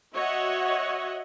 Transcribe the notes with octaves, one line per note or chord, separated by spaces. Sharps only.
F#4 C#5 D#5 E5 F#5